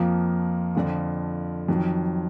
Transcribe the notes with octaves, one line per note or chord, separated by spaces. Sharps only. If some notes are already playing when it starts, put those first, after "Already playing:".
Already playing: F2 F3 A#3
F2 D3 F3
F2 D#3 F#3